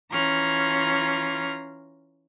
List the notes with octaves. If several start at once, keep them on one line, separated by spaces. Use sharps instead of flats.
E3 C#4 F4 A#5 F6 G#6